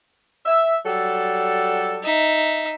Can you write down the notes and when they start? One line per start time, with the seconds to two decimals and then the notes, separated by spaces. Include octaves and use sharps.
0.45 E5
0.85 F#3 G3 A4
2.04 D#4 E5